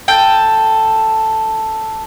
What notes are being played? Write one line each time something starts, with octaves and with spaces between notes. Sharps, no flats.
A4 G5